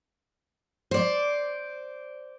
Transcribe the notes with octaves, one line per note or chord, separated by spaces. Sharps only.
C5 D5